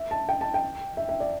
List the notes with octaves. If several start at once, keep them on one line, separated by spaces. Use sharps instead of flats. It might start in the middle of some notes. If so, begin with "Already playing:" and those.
Already playing: E5
A5
G5
A5
G5
E5
E5
D5